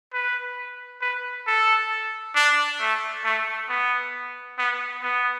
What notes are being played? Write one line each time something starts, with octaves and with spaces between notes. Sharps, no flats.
B4
B4
A4
D4
A3
A3
B3
B3
B3